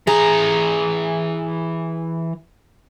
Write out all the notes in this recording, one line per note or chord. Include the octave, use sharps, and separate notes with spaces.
E3 G#4 A#5